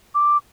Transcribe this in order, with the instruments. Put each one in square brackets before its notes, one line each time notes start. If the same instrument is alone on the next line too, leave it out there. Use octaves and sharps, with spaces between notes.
[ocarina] D6